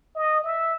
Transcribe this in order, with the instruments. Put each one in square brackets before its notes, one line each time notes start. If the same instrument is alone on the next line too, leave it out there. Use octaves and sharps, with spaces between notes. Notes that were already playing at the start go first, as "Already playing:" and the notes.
[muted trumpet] D#5
E5